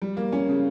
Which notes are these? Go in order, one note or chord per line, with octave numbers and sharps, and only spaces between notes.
G3
A#3
C#4
C#3